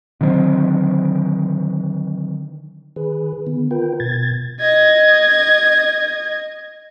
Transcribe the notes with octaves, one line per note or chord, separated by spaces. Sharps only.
D3 D#3 F#3 C4
D#3 G#4 B4
D3 D#3 B3
F4 A#4 B4 G5
B2 G#6 A6
D#5 G#6